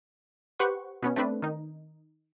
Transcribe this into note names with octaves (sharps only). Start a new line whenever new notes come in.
G4 B4 C5 F#5 C#6
B2 B3 C#4
A3 C4 D4 B4
D#3 D#4